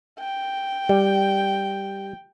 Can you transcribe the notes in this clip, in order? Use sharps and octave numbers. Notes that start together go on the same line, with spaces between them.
G5
G3